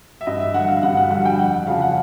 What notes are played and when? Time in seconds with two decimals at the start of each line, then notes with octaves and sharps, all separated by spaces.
0.21 E5
0.26 G2 D#5
0.40 E5
0.54 D3 G3 F#5
0.69 F5
0.83 G2 F#5
0.97 F#5
1.10 D3 G3 F#5
1.25 G5
1.39 F2 F#5
1.53 F#5
1.67 C#3 F3 F5
1.82 F#5